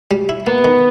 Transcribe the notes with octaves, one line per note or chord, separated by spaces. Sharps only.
G3
E4
A#3 B3
D#3